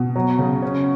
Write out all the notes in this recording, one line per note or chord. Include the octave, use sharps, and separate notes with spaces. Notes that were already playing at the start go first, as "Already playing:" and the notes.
Already playing: B2
F#3
C#3
C#4